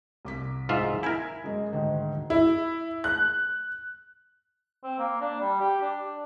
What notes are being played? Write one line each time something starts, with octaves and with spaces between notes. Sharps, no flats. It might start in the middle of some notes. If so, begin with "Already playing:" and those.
C2 D6 B6
G#2 F4 E5
E4 A#4 G#5 G#6
F#2 G#3
D2 G#2 D#3
E4
F#6
C4
A#3
D4
G3
G4
D4